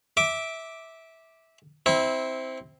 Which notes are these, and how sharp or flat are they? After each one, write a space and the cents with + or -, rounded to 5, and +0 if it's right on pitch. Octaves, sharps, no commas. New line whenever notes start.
E5 -15 D6 +0
C4 +0 E4 -25